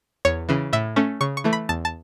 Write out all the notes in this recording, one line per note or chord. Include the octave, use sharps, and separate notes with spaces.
E2 C#5
C#3 E3
A2 E5
A3 C#4
C#3 C#6
C#6
E3 A3
B5
E2 A5
A5